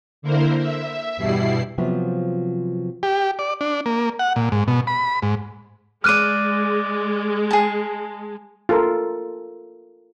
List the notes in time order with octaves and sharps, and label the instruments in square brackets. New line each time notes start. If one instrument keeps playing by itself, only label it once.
[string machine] D3 A#3 E4 A#4 C5
E5
E2 G2 B2 G3 E4 C7
[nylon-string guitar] C3 F3 F#3 B3 F4
[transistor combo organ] G4
D5
D4
A#3
F#5
A#2
G#2
B2
B5
G#2
[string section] G#3 [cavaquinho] D5 D6 [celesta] F6 F#6 D#7
[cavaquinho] G#4 A5
[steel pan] F4 A4 A#4